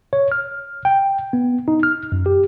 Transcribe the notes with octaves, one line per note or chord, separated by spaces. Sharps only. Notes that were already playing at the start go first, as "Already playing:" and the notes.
C#5
F6
G5
B3
D#4
F6
F#2
G4